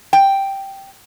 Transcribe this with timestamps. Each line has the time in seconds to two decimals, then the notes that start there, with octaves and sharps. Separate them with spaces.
0.13 G5